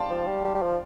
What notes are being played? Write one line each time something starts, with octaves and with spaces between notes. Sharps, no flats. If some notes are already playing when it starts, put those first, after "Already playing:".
Already playing: D5 F5 G5 A5 C6
F3
G3
G3
G3
F3